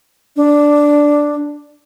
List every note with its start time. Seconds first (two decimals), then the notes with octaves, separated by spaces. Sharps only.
0.36 D4